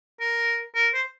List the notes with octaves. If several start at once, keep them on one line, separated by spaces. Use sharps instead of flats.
A#4
A#4
C5